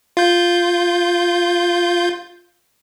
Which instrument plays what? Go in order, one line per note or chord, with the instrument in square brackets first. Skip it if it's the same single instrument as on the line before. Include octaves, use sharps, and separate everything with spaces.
[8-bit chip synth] F4 G6